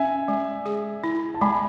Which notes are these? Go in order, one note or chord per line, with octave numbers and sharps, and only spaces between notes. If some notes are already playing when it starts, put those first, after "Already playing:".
Already playing: C#4 E5 G#5
G#3
G#4
E4
A5
G#3 G#5 B5